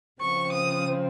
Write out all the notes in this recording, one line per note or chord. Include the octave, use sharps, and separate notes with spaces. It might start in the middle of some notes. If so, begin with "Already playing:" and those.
C#3 F3 C4 C#6
D#6